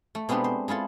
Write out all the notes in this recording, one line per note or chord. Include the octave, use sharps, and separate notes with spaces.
A3
B2 G#3 B3 C4 D4 G4
C5
G#3 E4 F4 A4